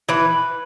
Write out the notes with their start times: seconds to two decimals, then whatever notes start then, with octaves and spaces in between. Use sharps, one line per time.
0.09 E3 B4